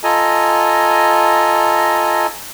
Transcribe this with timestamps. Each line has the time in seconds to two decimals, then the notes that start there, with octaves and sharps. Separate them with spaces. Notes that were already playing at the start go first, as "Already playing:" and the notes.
0.04 F4 A4 D#5 G#5 A#5